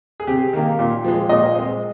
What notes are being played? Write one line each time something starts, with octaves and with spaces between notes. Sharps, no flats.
G#4
C3 G4
D#3 A#3
A#2
F3 G#3
A#2 D#5
G#3 C4